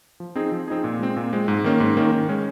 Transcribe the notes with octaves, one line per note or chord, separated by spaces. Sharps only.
F3
C4 D#4 G#4
F3
C4 D#4 G#4
A#2
G#3 C4
A#2
G#3 C4
G#2
D#3 A#3 C#4
G#2
D#3 A#3 C#4
D#3
G#3 C#4